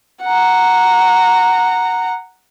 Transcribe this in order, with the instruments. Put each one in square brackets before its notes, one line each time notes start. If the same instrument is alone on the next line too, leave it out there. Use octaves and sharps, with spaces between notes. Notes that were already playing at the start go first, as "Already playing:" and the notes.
[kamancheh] F#5 A#5